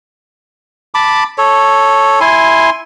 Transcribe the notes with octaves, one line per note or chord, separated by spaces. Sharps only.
A5 B5 D6
A4 C#5
E4 G#5 C6